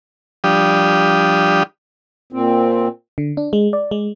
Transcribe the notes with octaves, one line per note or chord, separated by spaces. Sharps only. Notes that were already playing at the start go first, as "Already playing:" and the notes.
F3 G3 D4 G4 D#6
A#2 C4
D3
D4
G#3
D5
G#3